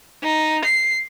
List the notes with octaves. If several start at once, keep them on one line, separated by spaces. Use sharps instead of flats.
D#4
C7